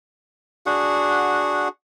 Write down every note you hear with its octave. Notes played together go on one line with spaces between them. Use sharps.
D4 F#4 G#4 F#5